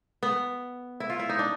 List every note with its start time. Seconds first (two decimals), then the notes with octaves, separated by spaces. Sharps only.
0.23 B3
1.00 E4
1.10 F4
1.20 E4
1.29 D#4
1.39 D4